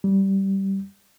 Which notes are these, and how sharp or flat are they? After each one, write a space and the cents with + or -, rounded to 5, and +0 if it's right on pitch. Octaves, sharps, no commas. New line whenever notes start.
G3 -15